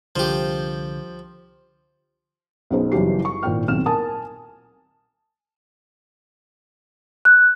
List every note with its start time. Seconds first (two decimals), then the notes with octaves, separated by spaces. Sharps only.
0.16 C2 D3 F3 G4
2.70 B1 F#2 B3 D#4 G#4 C5
2.92 F#1 E3 F#3 G3 G4 C7
3.25 C#6
3.43 G#1 A#2 E4 G5 F6
3.68 D#1 B1 C4 F6 E7
3.86 A#4 G#5 A5 D#6
7.25 F#6